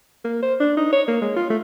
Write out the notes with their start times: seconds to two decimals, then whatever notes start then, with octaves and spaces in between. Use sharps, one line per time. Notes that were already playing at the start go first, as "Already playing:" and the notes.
0.24 A#3
0.43 C5
0.60 D4
0.77 D#4
0.93 C#5
1.08 A#3
1.21 G#3
1.36 F4
1.50 A3